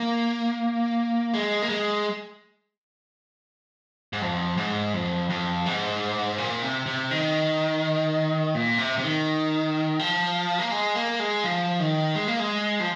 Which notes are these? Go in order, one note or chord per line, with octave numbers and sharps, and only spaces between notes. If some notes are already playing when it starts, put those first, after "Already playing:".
Already playing: A#3
G#3
A#3
G#3
G#2
F2
G#2
F2
F2
G#2
A#2
C3
C3
D#3
A#2
C3
C3
D#3
F3
A#3
G#3
A#3
G#3
F3
D#3
G#3
A#3
G#3
F3